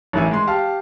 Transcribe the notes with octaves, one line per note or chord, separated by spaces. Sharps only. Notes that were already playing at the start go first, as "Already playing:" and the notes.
A1 D#3 E3 E5 G#5
G#3 C6
G4 F5 A5